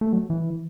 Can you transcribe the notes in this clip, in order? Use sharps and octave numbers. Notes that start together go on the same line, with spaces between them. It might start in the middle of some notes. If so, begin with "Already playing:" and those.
A3
F#3
E3